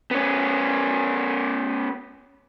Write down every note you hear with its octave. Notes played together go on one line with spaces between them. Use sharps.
B3 C#4